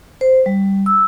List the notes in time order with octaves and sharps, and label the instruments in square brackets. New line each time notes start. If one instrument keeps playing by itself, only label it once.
[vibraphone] C5
G3
E6